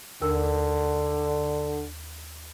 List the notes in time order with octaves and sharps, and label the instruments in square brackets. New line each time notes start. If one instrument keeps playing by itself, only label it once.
[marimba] D#2 A#4 E6 [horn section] D3